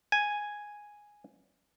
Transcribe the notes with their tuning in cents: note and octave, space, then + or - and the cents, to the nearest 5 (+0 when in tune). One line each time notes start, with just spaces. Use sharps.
G#5 +0